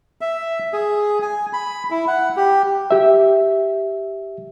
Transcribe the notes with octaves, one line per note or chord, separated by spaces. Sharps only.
E5
G#4
G#5
B5
E4
F#5
G4
G4 E5